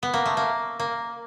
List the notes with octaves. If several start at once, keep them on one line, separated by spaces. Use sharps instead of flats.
B3
A#3
A3
A#3
A#3